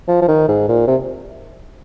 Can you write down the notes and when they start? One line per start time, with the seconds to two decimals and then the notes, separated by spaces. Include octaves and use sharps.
0.08 F3
0.22 F3
0.28 D#3
0.48 G#2
0.69 A#2
0.87 C3